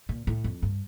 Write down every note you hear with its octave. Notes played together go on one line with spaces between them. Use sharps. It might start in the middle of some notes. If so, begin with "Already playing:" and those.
A#2
A2
F2
G2